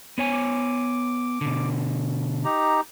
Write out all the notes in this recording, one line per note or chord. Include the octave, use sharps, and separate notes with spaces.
B3 C#5 G#5
D6
B2 D3
D#4 G4 A#5